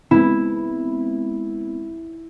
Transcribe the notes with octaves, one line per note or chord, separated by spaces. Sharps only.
G#3 B3 C4 E4